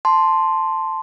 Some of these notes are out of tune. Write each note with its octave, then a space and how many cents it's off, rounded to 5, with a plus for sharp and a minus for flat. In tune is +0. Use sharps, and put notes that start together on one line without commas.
A5 +0 C6 +0